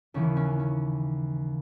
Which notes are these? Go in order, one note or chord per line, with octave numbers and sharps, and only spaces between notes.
D#2 C#3 E3 C#4
C#4
C#4